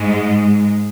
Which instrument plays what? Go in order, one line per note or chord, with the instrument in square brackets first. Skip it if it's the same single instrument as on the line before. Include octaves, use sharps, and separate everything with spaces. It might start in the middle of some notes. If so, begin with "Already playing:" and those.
Already playing: [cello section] G#2 G#3